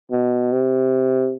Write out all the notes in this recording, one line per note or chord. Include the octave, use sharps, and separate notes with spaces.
B2
C3